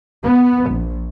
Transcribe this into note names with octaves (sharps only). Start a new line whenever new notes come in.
B3
A#1